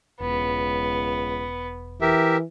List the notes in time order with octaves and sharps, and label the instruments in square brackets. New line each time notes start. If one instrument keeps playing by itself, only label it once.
[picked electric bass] E1 [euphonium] C#2 [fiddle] B3
[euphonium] E3 [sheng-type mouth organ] G4 A#4 E5